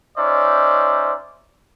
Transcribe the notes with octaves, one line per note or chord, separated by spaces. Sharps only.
C#4 D#4 C5 D5 E5